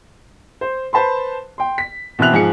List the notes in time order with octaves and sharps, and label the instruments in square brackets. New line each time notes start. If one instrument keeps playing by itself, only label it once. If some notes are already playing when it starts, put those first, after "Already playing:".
[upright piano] C5
B4 C5 A5 B5 C6
G5 C6
B6
B2 E3 C4 E5 F#6 F7
G#2 F3 G#4 C#7